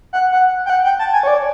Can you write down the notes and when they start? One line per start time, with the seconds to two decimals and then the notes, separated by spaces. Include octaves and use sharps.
0.13 F#5
0.32 F#5
0.66 G5
0.70 F#5
0.84 G5
0.99 A5
1.13 G#5
1.23 C#5
1.27 D5